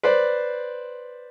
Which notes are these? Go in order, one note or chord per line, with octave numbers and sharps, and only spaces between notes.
B4 C5 D5